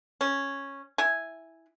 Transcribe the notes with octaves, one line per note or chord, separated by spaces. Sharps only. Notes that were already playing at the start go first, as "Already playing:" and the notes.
C#4
E4 G#5